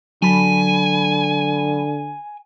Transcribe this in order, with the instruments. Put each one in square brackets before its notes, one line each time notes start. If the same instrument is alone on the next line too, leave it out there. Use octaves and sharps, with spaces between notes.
[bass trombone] D3 [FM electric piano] F#3 A5 B5 [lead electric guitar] G#5